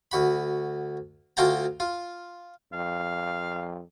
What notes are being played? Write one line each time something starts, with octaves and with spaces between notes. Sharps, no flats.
D2 F#4 B5
D2 F4 F#4 G5 A5 A#5
F4
F2 F5